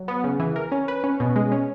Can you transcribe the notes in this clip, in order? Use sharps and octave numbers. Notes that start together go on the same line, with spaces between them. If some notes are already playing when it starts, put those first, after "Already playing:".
Already playing: F#3
B3
C#3
E3
A#4
C#4
B4
C#4
B2
G#3
C#4